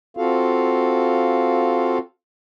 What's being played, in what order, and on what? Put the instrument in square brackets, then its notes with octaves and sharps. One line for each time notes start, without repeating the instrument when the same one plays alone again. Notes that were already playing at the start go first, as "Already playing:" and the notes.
[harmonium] C4 F4 F#4 A4 F5